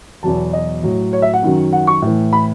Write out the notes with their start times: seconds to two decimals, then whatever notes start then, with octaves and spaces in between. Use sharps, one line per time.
0.23 E2 B2 F#3 A5
0.53 D#5
0.83 A2 F#3
1.13 C#5
1.22 E5
1.33 F#5
1.42 F#2 D#3 F#3
1.73 F#5
1.87 C#6
2.02 A2 E3
2.33 B5